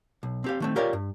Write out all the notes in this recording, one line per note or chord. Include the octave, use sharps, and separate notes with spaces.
B1
C4 G4 F5
D#3 A3 C4
F4 G4 A#4 C#5 D5 F5
G2